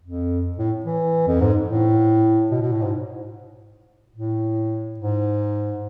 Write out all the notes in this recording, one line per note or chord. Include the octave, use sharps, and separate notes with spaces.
F2
A2
E3
F2
G#2
A2
B2
B2
A2
G#2
A2
G#2